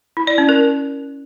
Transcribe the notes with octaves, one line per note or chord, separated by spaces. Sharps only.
E4
D5
C#4
A#4